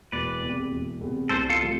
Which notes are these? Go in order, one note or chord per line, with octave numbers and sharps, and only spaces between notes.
E1 B4 D5
E2 C3
E1
E2 C3
C2 A4 C5
F4 A4
C3 F3 A3